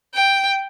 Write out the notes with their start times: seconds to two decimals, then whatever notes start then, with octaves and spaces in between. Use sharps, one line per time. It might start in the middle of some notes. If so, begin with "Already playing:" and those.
0.14 G5